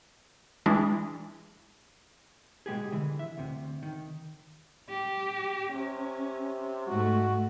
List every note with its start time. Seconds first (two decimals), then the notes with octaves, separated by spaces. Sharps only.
0.66 E3 G#3 D4 E4
2.66 B2 G#3 G4 G#4
2.92 D3 E3
3.19 E5
3.37 D2 C3
3.83 D#3
4.90 G4
5.73 C3 C#4
6.87 G#2 A3 F#4